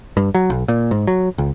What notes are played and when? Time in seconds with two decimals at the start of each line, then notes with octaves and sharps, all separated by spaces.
0.17 G2
0.35 F#3
0.50 B1
0.68 A#2
0.91 G#2
1.07 F#3
1.38 C#2